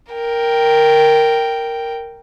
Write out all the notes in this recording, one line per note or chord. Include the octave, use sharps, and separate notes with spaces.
A#4 G5